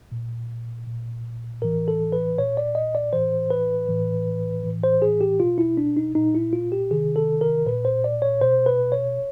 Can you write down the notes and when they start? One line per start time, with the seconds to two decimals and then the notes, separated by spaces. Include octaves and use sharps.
0.12 A#2
0.87 A#2
1.62 A2 E3 A#4
1.88 A4
2.12 B4
2.38 A#2 C#5
2.57 D5
2.75 D#5
2.95 D5
3.13 A2 E3 C5
3.50 B4
3.89 A2 E3
4.64 A2 E3
4.83 C5
5.02 G#4
5.21 G4
5.40 B2 F4
5.58 E4
5.77 D4
5.97 D#4
6.15 A#2 D#4
6.35 E4
6.53 F4
6.72 G4
6.91 C3 D#3 G#4
7.16 A4
7.41 A#4
7.66 A#2 B4
7.85 C5
8.04 D5
8.22 C#5
8.41 B2 C5
8.66 B4
8.92 C#5